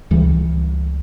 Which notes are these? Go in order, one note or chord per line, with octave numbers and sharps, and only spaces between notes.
C#2 E3 G3